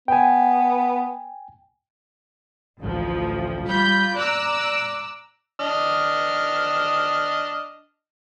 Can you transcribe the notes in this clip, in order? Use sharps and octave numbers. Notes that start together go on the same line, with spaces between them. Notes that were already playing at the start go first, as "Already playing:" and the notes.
B3 G5 G#5
A1 D2 F3
G3 F4 B5 G6
D5 A#5 D6 E6 F#6
D4 D#5 F6